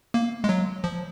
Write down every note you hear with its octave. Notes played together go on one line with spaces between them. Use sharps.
A#3
G#3
F#3
F3